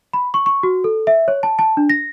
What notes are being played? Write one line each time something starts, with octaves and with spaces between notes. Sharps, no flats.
B5
C#6
C#6
F#4
A4
E5
C#5
A5
A5
D4
A#6